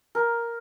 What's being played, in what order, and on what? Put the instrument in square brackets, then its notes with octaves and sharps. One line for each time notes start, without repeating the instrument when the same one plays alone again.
[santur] A#4